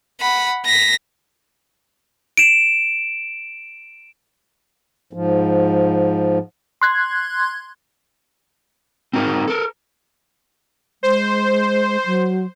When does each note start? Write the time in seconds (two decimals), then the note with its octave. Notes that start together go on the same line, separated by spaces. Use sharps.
0.21 F#5 B5
0.66 A#6 B6
2.37 D7 E7
5.13 G#2 F3
6.81 C6 F#6 G#6
9.13 C4 D#4 F#4 A#4
9.48 A4 A#4
11.03 G#3 C5
12.06 F#3